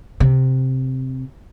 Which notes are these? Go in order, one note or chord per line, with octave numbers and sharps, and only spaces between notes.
C3